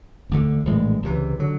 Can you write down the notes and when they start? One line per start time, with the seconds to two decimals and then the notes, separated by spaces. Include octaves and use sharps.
0.29 E1 D2 D3
0.65 A#1 A2 E3 G#3
1.02 C#2 C3 E3
1.39 D3 F#3